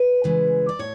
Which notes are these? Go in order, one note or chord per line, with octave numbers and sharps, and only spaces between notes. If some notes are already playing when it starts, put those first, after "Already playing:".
Already playing: B4
C#3 E3 G#3
D5
A2 C#5